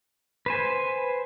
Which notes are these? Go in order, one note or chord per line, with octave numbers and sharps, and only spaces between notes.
B4 C5 G#5